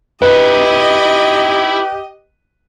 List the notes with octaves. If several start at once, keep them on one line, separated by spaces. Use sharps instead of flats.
D#4 E4 G4 B4 D#5